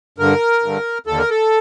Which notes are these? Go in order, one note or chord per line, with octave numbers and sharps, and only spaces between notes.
G2 D3 A#4
G2 D3
D#2 D3 A4
A#4
A4